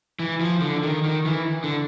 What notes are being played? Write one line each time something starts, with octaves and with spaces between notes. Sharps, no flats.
E3
F3
D3
D#3
D#3
E3
D3